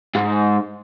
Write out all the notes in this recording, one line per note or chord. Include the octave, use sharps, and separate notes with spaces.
G#2